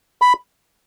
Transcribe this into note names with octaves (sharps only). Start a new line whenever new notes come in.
B5